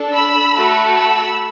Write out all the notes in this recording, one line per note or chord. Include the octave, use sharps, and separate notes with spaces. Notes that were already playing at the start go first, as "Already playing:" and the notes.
Already playing: D4 A4
B5 E6
A3 F#4 A4
B5 E6